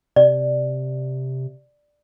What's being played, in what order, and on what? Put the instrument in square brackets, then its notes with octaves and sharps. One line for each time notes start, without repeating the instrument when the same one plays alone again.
[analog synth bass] C3 [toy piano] D5